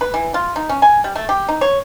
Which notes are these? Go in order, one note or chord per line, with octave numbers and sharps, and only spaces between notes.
B4
E3
F4
D#4
C#4
G#5
G3
A3
G4
D#4
C#5